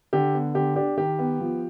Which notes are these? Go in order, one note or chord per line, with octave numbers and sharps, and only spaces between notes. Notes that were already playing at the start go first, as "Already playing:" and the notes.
D3 G4
B3
D3 G4
D4 G4
D#3 G4
B3
F3